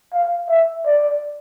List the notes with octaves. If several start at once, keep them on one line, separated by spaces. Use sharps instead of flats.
F5
E5
D5